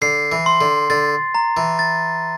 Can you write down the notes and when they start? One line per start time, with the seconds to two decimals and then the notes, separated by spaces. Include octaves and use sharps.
0.02 D3 C7
0.32 E3
0.46 C6
0.61 D3
0.90 D3 A6
1.35 A#5
1.57 E3
1.79 A6